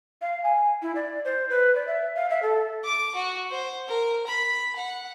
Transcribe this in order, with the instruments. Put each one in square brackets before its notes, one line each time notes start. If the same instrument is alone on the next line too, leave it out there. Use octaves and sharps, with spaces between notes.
[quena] F5
G#5
E4
D5
C5
B4
D5
E5
F5
E5
A4
[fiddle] D6
F#4
C5
A#4
B5
F#5